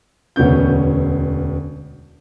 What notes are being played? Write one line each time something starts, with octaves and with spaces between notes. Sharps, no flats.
E1 D2 B3 C#4 G6